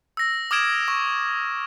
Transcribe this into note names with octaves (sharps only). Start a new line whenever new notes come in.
E6 A#6
D6 D#6 F6 G#6 D7 E7
C#6